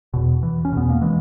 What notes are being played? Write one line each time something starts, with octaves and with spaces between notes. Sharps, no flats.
E2 B2
E3
C#4
E2 B2 B3
A#3
E3 G#3